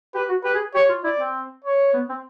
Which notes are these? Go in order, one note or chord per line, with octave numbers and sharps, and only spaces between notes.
G4 B4
F#4
G4 B4
G#4
G4 C#5
F4
E4 D5
C4
C#5
B3
C4